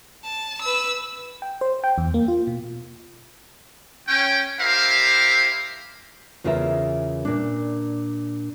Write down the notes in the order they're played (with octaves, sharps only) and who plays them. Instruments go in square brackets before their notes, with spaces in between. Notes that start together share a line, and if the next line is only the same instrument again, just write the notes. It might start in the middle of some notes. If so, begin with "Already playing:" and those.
[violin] A5
B4 E6
[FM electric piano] G5
C5
G5
E2
A#3
F4
B2
[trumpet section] C#4 G5
E4 G4 A#4 C5 E5 F5
[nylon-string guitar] E2 C#3 F4 G#4 A#4 E5
A#2 D4